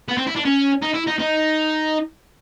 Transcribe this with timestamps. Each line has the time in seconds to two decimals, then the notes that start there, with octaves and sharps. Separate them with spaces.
0.08 B3
0.17 C4
0.27 E4
0.36 D4
0.45 C#4
0.82 D#4
0.94 E4
1.07 D#4
1.19 D#4